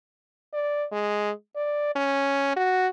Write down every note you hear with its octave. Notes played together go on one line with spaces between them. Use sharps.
D5
G#3
D5
C#4
F#4